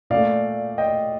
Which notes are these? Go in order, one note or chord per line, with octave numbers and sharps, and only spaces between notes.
A#2 A3 D5 F5
D#5 G5